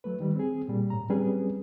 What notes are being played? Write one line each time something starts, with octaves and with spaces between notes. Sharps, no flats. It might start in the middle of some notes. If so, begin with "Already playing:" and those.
F#3 A3 B4
D#3 G3
C4 G#4
A#2 G3
A2 A#5
F#3 G3 C4 C#4 G#4 B4